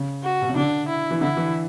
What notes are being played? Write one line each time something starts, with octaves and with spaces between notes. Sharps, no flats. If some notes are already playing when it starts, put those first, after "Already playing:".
Already playing: C#3
F#4
B2
C#3
D3 D4
E4
E3
D3 E4
E3